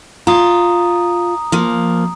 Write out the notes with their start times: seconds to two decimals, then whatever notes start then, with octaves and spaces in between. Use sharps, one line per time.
0.27 F4 A#5 D#6
1.52 F3 A#3